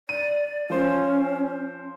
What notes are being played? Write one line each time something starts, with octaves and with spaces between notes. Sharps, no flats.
D5 D#7
F3 C#4 C5